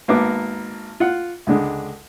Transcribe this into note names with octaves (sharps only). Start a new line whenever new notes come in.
G#1 A#3 B3 D6
F4 F#5
C#2 D3 G#3